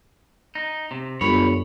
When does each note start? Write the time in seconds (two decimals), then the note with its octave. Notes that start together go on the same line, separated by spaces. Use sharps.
0.55 D#4
0.91 C3
1.21 G1 F#2 C#5 B5